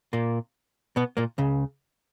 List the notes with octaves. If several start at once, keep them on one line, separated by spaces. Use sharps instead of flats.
A#2 A#3
B2 B3
A#2 A#3
C#2 C#3